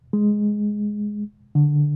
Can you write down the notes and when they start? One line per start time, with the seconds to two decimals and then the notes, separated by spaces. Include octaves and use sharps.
0.13 G#3
1.55 D3